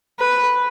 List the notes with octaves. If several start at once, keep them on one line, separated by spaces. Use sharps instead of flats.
B4